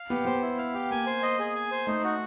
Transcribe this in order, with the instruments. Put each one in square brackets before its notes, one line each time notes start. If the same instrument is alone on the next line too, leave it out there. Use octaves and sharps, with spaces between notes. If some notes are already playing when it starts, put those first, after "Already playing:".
Already playing: [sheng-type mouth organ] F5
[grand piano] B3 [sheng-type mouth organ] G4
[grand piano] B3 [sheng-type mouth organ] C5
[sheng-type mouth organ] E4
F5
G4
[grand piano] A#3 [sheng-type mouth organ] G#5
[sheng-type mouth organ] C5
D#5
G#4
G#5
C5
[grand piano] A3 [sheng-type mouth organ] D#4
[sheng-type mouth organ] F#4